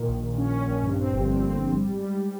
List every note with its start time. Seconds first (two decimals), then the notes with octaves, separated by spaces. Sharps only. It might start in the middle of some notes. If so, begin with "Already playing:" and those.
Already playing: A#2 D#3
0.08 A#1
0.23 A#1
0.38 C#4
0.53 C#4
0.68 A#1
0.83 G2
0.98 C4
1.13 G1
1.28 G2
1.43 C4
1.58 G1
1.73 G3
1.88 G#2
2.03 G3